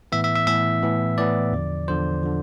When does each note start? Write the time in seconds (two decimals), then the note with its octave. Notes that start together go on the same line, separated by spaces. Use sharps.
0.12 A2 E3 B3 E5
0.24 E5
0.36 E5
0.47 A2 E3 B3 E5
0.83 A2 E3 B3
1.18 A2 E3 B3 D5
1.52 E2 D3 F3
1.88 E2 D3 F3 C5
2.23 D3 F3